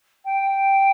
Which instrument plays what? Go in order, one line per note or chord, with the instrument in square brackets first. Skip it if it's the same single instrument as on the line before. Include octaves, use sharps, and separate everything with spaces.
[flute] G5